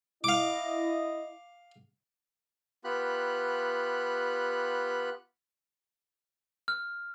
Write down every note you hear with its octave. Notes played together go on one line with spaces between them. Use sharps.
E4 D#5 F5 D6
B3 F4 G4 B5 F#6
F6